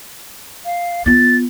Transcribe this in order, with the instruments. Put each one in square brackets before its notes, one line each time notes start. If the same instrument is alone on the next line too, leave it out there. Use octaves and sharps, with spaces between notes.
[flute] F5
[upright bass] B3 F4 [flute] A6